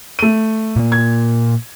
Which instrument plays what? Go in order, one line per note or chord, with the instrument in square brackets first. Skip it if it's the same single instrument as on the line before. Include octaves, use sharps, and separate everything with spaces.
[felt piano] A3 D#7
[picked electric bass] A#2 A#3
[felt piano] G#6